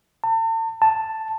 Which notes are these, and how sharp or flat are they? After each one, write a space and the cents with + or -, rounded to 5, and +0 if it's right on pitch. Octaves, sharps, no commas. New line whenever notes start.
A5 +40
A5 +5